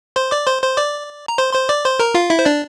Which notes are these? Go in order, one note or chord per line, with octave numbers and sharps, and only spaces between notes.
C5 C6
D5 D6
C5 C6
C5 C6
D5 D6
A#5
C5 C6
C5 C6
D5 D6
C5 C6
A#4 A#5
F4 F5
E4 E5
C5
D4 D5